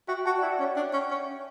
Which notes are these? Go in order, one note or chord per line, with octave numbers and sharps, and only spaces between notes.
F#4 E5 G5
G5
F#4 F#5 A5
E4 D5 F#5
D5 F#5
C#4
C#5 E5
D4 E5 G5
C#4
C#4